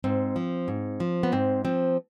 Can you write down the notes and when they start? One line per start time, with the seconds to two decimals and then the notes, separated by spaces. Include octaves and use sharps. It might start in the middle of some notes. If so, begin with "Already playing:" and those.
0.04 G#2 C4
0.36 F3
0.68 G#2
1.00 F3
1.23 B3
1.32 G#2 C4
1.65 F3 C4